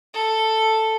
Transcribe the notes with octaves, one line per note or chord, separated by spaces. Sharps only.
A4